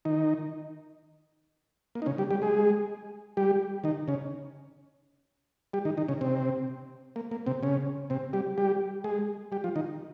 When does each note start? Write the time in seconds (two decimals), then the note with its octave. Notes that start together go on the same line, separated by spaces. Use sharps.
0.05 D#3 D#4
1.95 A#3
2.02 D#4
2.06 C#3 C#4
2.18 G3 G4
2.31 G3 G4
2.42 G#3 G#4
3.37 G3 G4
3.84 D#3 D#4
4.08 C#3 C#4
5.73 G3 G4
5.85 D#3 D#4
5.97 D#3 D#4
6.08 C#3 C#4
6.21 C3 C4
7.16 A#3
7.31 A#3
7.46 C3 C4
7.63 C#3 C#4
8.10 C3 C4
8.33 G3 G4
8.58 G3 G4
9.04 G#3 G#4
9.52 G3 G4
9.64 F3 F4
9.76 D#3 D#4